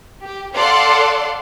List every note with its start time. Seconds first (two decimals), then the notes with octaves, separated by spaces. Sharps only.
0.23 G4
0.56 A4 D5 F5 F#5 C6